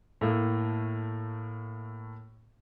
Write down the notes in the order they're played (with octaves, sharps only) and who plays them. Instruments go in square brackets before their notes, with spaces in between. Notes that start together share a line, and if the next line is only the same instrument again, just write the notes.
[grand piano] A2 A3 A#3